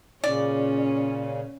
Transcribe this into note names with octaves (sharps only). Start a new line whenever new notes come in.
A#2 C#3 C#4 D5